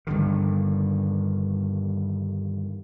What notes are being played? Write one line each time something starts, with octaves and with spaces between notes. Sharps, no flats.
G2 D3 D#3